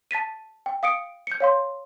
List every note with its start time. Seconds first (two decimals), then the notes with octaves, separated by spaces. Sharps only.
0.11 A5 A6 B6 D#7
0.66 G5
0.83 F5 D#6 C#7 D7
1.27 G6 C#7
1.40 C#5 F5 C6